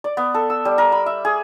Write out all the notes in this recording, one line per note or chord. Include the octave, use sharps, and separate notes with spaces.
D5
B3
A4
E6
G3
A#4
B5
E5
G#4